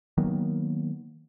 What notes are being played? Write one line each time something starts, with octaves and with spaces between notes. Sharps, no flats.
D#3 F#3 A#3 B3